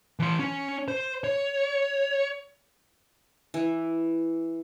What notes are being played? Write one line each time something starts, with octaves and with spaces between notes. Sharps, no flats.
E3 C6
C#4
C5
C#5
E3